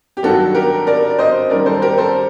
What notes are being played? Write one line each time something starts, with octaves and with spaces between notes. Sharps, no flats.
G4
G2 D#3 F#3 F#4 A4
G4 A#4
A#4 D5
D5
C5 D#5
F#2 D#3 G3 A#4 D5
A4 C5
G4 A#4
A4 C5